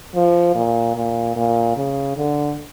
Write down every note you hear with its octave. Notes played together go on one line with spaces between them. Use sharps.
F3
A#2
A#2
A#2
C#3
D3